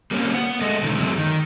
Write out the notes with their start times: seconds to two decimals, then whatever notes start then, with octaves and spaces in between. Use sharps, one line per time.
0.11 G3 A#3 C4 C#4
0.34 B3 F#5
0.61 G#3 A3 A4 D#5
0.83 B2 D3 D#3
0.95 F#2 C3 D#3 F#3 G#3 A3
1.17 D#3